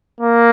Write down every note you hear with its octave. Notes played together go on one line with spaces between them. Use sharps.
A#3